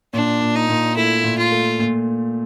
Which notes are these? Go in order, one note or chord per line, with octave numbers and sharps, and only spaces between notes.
A#2 D4
A#2
D#4
A#2
A3 E4
A#2
F4
A3
A#2